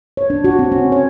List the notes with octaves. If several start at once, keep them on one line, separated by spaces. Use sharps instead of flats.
C#5
D4
F#4
C4
C#4
C#5